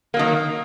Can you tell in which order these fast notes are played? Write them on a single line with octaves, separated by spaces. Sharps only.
A#3 F#3 D#3